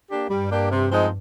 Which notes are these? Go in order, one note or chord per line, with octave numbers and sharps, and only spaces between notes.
A#3 D4 G4
G2 G3
A#3 D4 G4
C3
F3 G#3 C4 D#4